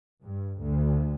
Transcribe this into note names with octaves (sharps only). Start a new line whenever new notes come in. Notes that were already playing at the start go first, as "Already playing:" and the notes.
G2
D2